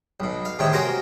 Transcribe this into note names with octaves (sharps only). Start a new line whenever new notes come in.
B1 B2
F5
E2 A2 C3 D#3 C#5
C#4 F#4 G4 A#4 C5